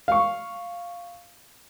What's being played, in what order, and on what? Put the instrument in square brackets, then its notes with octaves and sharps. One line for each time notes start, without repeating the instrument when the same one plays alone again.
[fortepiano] F5 C#6